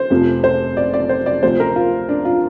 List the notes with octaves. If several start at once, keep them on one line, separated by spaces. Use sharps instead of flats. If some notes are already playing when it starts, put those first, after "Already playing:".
Already playing: C5
F1 F2 C3 F3
C5
D5
D5
C5
D5
D2 C3 F3 C5
A#4
F4
D4
F4